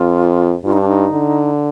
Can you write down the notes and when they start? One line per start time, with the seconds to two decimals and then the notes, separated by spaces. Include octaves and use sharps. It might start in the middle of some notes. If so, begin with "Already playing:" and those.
Already playing: F2 F4
0.65 G2 F4
0.72 D#4
0.80 D4
0.88 D#4
1.11 D3